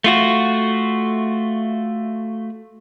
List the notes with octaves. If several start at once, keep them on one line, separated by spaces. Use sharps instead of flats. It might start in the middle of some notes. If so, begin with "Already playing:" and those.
A3 F4 F#4